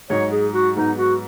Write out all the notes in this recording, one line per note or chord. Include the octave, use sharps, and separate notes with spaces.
G#2 F#3 D#4 C#5
G#4
F#4
G#2 F#3 B3 D#4
F#4